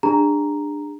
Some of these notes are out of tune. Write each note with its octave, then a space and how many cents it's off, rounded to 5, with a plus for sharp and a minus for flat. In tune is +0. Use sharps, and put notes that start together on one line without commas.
D4 +15 G#4 -35 A#5 +0